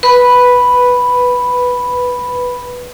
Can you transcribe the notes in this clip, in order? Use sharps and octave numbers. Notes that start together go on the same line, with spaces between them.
B4 B5